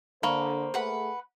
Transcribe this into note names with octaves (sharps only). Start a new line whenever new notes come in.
D3 A#3 C5 B5 C#6
A3 G#4 B4 F#5 B5